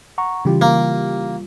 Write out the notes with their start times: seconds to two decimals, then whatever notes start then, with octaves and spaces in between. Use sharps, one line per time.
0.18 F#5 A#5 C#6
0.45 C#3 E3 G3 F4 G4
0.62 A#3